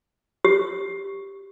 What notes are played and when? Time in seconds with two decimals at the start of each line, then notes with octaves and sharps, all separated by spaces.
0.45 G4